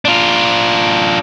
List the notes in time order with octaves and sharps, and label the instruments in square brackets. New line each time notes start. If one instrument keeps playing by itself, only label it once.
[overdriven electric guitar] D4 F4